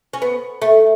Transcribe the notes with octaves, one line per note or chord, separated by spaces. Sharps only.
C#4
B3
A3